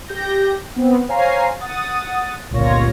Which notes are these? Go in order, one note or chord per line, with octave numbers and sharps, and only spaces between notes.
G4 G6 A#6
B3 C4
C5 C#5 F5 G#5 A#5 C7
F#5 D#6 A6
G1 C#2 A#2 F4 C#5 A#6